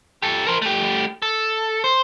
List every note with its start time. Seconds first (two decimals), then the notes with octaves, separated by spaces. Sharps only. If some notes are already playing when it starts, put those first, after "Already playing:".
0.22 G4 A4
0.47 A#4 C5
0.62 A3 G4
1.22 A4
1.84 C5